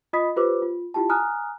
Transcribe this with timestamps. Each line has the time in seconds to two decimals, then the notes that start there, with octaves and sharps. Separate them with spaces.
0.13 F4 D#5 B5 D#6 B6
0.36 F4 G4 B4 C5 D6
0.62 F4
0.94 E4 F4 G4 G5 A5
1.09 G#5 A#5 D#6 F6 F#6